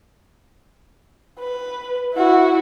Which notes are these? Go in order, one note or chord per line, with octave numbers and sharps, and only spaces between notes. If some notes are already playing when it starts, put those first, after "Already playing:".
B4
E4 F#4